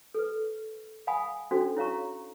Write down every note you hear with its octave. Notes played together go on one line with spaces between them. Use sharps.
A4 B4
F5 F#5 G#5 B5 D#6
C#4 D4 F#4 A4 C5
E4 C#5 F5 A#5 C#6